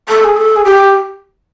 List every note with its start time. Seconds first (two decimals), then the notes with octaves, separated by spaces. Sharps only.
0.09 A4
0.24 G#4
0.37 A4
0.56 G#4
0.64 G4